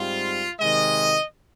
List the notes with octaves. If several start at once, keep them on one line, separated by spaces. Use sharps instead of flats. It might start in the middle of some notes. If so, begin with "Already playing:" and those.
Already playing: G#2 G3 C4 F4
C3 D#3 G#3 D#5